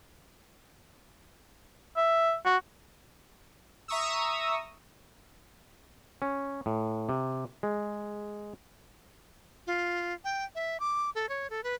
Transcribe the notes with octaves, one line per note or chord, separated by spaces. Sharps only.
E5
F#4
E5 A#5 C#6 D#6 E6
C#4
A2
C3
G#3
F4
G5
E5
D6
A4
C#5
A4
B4